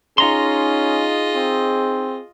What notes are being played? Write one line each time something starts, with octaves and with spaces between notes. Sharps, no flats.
C#4 D#4 F4 G#4 D#5 A#5 C6
C4